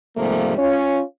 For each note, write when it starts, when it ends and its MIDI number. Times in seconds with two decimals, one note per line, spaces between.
0.17 0.55 44
0.17 0.55 48
0.17 0.55 53
0.17 0.55 55
0.17 0.55 57
0.17 0.55 58
0.58 1.02 61
0.58 1.02 65
0.58 1.02 73